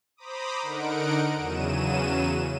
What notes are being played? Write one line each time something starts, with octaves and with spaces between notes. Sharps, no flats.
C5 A#5 B5 D6 D#6
D3 D#4 A#4 F#5 D7
E2 C#3 F#3 D#7 E7